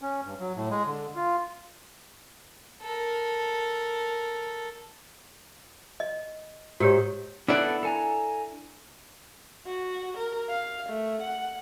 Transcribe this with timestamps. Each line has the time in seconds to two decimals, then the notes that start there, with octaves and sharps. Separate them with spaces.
0.01 C#4
0.25 G2
0.39 F#3
0.56 A2
0.71 G#3
0.86 D3
1.15 F4
2.81 A4 A#4
6.00 D#5
6.80 G#2 F#4 G4 C#5
7.48 B3 D4 E4 A4 D5 F#6
7.83 A4 G#5 A#5
9.66 F#4
10.17 A#4
10.50 F5
10.89 A3
11.22 F#5